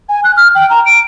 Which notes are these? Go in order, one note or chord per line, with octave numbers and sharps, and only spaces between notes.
G#5
F#6
F6
G5
A#5
D7